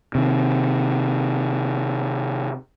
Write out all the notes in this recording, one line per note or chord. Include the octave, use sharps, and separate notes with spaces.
C3 D#3